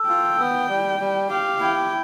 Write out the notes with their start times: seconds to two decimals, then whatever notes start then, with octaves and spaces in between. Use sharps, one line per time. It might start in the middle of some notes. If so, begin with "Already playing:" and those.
Already playing: A4
0.09 F4 G5
0.39 B3
0.69 G3
1.00 G3
1.29 G4 F5
1.60 E4 G5